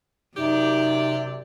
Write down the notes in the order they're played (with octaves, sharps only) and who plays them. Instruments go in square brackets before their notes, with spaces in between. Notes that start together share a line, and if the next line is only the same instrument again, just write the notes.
[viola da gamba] F#2 D5 [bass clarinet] C3 [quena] D#4 [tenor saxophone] G4